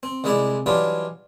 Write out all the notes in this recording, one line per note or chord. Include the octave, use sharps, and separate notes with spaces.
C4
C2 C3 G#3 D#4 E4 D5
E3 F#3 G3 D4 D#4 F4